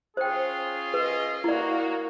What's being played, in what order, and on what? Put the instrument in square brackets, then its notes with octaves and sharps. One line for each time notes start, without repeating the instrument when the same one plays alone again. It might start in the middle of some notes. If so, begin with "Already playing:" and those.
[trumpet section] C#4 F4 G#4 [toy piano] C5 G5
[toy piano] B4 [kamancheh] D#5
[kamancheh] A#3 F#4 [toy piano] E4 D5